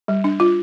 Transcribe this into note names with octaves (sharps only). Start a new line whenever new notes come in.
G3
D4
F4